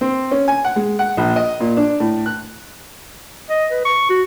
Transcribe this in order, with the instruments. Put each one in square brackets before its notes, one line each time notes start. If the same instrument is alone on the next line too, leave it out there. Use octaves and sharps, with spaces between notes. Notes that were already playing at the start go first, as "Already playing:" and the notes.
[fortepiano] C4
C#4
G#5
F#5
G#3
F#5
A#1
D#5
A#2
D4
A2
F#6
[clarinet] D#5
B4
C#6
F#4